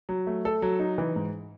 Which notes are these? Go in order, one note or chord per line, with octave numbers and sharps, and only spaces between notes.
F#3
A3
A4
F#3
D#4
E3
G#2